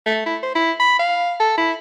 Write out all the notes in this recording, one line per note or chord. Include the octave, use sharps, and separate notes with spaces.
A3
E4
C5
E4
B5
F5
A4
E4